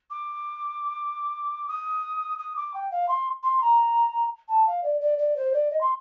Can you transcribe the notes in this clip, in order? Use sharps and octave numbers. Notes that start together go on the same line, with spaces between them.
D6
D#6
D#6
D6
G5
F5
C6
C6
A#5
A5
F5
D5
D5
D5
C5
D5
D#5
C6